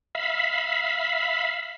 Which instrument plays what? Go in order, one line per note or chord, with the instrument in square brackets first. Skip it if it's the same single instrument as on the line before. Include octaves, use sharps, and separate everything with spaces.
[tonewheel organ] E5 F5 B5